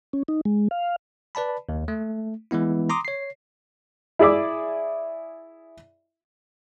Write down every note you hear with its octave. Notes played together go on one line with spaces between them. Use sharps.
C#4
D#4
G#3
F5
B4 D5 A5 B5
D#2
A3
E3 G#3 B3 E4
A#5 C6 D6 D#6
C#5 C7
E4 G#4 D5 E5 D6